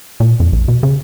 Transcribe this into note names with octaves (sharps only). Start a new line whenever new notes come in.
A#2
F2
A#1
B2
C#3